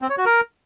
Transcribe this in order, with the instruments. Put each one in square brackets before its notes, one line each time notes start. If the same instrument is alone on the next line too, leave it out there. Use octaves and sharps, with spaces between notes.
[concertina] C4
C#5
F#4
A#4